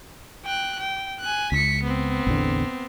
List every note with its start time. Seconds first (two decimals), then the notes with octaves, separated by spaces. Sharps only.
0.45 G5 F#6
0.79 G5
1.20 G#5 F#6
1.52 C#2 B6 C#7
1.83 B3 C4
2.27 A1 E2 D3